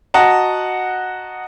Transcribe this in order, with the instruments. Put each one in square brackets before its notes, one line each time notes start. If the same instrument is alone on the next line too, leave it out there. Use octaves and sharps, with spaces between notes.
[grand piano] F#4 D#5 F#5 A5 A#5